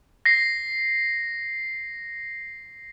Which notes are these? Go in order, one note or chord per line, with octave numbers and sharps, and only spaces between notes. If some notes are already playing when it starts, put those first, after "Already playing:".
A#6 C7